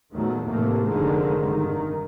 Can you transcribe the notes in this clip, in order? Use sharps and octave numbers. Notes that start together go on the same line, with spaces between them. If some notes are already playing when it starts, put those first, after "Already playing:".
E2 A#2 D#3 F#3 A3 B3
A2 C3 D#3 E3 A3 A#3
F1 G#2 D3 D#3 F3 G#3
G2 D#3